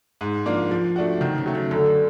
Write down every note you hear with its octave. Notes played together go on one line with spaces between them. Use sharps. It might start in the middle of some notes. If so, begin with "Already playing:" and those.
G#2
F3 A#3 D4
F3
A3 D4 F#4
C3 D#3
C#3
F#3 A3
C#3
F#2 D3